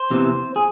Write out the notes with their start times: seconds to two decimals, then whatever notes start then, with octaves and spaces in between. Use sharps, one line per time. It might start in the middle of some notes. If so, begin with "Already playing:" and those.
Already playing: C5
0.10 E2 C3 E3
0.56 G#4